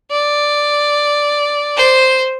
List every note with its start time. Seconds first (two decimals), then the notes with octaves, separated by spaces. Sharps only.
0.11 D5
1.77 C5